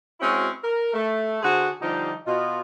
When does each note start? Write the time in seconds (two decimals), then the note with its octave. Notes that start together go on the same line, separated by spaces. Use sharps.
0.21 G#3 C4 C#4 E4 F#4
0.62 A#4
0.94 A3
1.42 D3 F#4 G#4 C5
1.81 D3 F3 G3 D#4 F4 G4
2.26 B2 F4 D#5